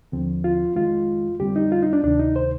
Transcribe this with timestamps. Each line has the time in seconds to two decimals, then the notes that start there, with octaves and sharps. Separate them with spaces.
0.12 D#2 D3 F3 C4
0.44 F4
0.76 F2 D#3 G#3 F4
1.40 F2 D3 G3 C4 G4
1.56 D#4
1.72 F4
1.82 D#4
1.93 D4
2.04 D2 C3 D#3 D4
2.19 D#4
2.36 C5